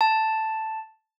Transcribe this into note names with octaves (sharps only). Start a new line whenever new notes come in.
A5